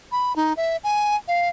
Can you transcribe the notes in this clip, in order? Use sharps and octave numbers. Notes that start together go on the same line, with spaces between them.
B5
D#4
E5
G#5
F5